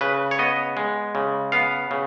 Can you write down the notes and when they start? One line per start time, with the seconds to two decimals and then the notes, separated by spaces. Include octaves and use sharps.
0.01 C#3 B4
0.31 C#5
0.39 B3 D#5
0.77 G#3
1.15 C#3
1.52 B3 F5
1.91 C#3